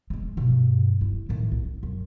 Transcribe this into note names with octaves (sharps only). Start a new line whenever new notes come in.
G#3 A3
G2 B2
C3 E4
A2 D#3
C2
F#2